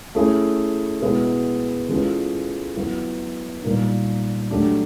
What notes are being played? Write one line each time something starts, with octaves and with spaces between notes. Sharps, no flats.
A3 C#4 E4 G#4
B2 G#3 B3 E4
E3 G#3 C#4 F4 A4
F#3 B3 E4
A#2 G3 A#3 D#4
F#3 A3 D4 G4